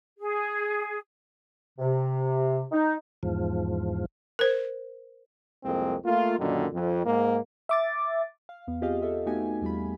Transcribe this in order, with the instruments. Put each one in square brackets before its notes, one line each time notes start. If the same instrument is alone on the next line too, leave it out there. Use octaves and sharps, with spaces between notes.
[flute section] G#4
[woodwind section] C3
D#4
[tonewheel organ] E2 G#2 F3
[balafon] A#4 C5
[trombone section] C2 F2 G#3 A#3 C4
A3 A#3 F4
F#2 A#2 D3 D#3
F2
G#2 A#3
[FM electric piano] E5 D6 A6
[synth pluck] F5
E2 B3
C4 F4 G4 G#4 D#5 F5
A4 D#5 E5
A3 B3 D#4 F#4 G4 G#5
E2 G3 F4 B5